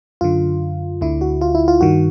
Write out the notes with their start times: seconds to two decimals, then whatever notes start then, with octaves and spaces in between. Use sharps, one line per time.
0.21 F#2 D3 F4
1.01 D2 D3 E4
1.21 F#4
1.41 F4
1.55 E4
1.68 F4
1.81 G2 D#3 F#4